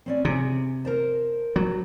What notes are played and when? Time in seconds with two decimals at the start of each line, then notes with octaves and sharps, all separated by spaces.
0.06 C4 C#4 D5
0.25 C3 G#4
0.85 A#4 C5 A5
1.56 F#3